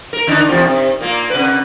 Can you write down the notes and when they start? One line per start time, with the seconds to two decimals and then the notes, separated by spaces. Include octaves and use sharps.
0.13 A#4
0.27 D3 D4 D#4
0.48 E2 C3 F3
0.65 C3
1.01 A#2 A#3
1.30 C3 B4